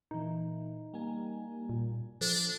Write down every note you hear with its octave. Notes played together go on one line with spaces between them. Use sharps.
A#2 E3 D#4
G3 A#3 G#5
A#2
F3 D4 A4